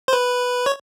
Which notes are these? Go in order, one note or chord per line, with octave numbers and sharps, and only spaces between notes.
C5
B4
C#5